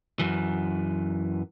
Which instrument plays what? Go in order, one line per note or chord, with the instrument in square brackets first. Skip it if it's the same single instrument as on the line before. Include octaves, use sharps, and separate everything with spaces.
[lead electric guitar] F#2 E3